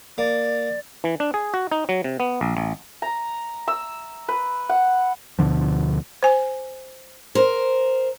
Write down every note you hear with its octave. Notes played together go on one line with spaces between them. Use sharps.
A#3 D5
E3
D4
G#4
F#4
D#4
F#3
C3
B3
A#1
A1
A#5
E6
B4
F#5
D2 B2 D3 F3
C5 G#5
A#4 C5